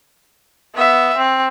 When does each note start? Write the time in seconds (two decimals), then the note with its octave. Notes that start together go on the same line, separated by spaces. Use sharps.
0.75 B3 E5
1.17 C4